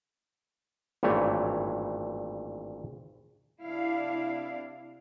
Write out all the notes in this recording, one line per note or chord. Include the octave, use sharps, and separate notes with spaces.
G#1 G2 A#2 E3 A3 C#5
C3 D4 E4 F5